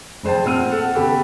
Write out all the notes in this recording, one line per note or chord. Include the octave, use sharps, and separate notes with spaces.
F1 G#4 C5 G5 A5
A#2 C4 F#5 F6 D#7
A4 F#5
C#3 B3 G4 A4